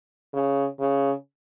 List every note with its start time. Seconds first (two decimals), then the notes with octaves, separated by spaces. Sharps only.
0.34 C#3
0.80 C#3